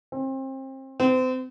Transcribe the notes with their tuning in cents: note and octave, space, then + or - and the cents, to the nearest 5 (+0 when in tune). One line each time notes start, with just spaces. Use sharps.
C4 +30
C4 -35